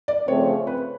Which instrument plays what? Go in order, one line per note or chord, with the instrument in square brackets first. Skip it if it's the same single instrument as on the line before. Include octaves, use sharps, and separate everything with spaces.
[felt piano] D5
[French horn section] C#3 F3 A3 C4 [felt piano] C#5
[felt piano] B4